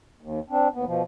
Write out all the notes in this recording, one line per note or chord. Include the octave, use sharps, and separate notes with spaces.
D#2
C4 D4
D#2 B3
B2 F3